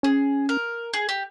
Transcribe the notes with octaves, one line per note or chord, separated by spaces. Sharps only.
C#4 G#4
A#4
G#4
G4